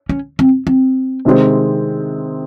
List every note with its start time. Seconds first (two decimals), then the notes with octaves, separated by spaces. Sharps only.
0.09 C#4
0.39 C4
0.67 C4
1.25 C3 D#3 G#3 C4